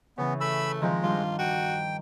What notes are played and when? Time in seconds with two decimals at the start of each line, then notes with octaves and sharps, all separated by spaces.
0.18 C#3 E3 B3
0.41 A3 B5 E6
0.82 D#3 F3 G#3 C4
1.03 G2 F4
1.39 F#4 G5